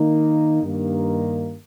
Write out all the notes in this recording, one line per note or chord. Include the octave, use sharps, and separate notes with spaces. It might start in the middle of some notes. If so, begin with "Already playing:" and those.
Already playing: D#3 A#3 D#4
G2 D#3 A#3